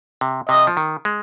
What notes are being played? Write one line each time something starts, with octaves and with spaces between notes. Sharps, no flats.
C3
C3 D#5
F3
D#3
G#3